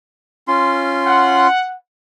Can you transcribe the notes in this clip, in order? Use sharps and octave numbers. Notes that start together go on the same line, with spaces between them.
C#4 F4 C6
F#5